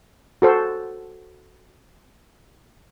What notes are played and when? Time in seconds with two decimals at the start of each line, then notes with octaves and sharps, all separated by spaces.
0.42 F#4 A4 C5